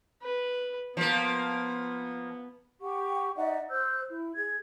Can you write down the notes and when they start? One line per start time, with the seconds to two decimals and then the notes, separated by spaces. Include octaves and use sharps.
0.22 B4
0.97 F3 A#3 B3
2.81 G4 F#5 C#6
3.36 D#4 D5 E5 F#5
3.70 C5 E6 F#6 G6
4.08 E4
4.35 G#4 G#6